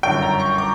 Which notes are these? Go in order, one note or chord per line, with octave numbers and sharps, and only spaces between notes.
G1 F#2 D3 F#3 G5
A#5
C#6
D6